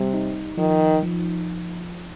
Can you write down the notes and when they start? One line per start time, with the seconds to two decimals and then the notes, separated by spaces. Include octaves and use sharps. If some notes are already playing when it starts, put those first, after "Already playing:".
Already playing: C3 G3
0.14 D#4
0.57 D#3 F3
1.03 F3